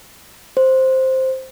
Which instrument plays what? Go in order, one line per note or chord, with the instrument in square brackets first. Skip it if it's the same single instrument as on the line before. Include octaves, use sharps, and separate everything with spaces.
[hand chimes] C5